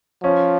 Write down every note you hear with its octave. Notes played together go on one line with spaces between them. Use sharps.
F3 C#4